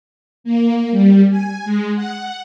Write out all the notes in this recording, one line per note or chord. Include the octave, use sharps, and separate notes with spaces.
A#3
G3
G#5
G#3
F#5